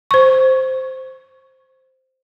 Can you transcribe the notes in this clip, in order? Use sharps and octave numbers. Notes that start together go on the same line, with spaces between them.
C5 C#6